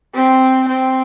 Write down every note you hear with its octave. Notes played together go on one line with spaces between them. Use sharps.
C4
C4